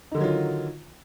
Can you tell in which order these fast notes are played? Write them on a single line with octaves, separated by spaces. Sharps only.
D#4 D3 D#3 F#3 F4